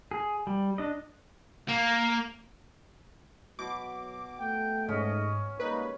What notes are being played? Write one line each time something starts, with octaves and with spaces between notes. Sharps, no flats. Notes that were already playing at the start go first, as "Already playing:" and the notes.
G#4
G3
D4 D#5
A#3
B2 F#3 D6
A3 G5
G#2 C#4 D#5
G3 G#3 A#3 D#4 B4